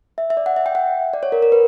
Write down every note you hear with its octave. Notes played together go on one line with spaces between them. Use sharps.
E5
E5
D5
F#5
E5
G5
F#5
D5
C#5
A#4
A#4
B4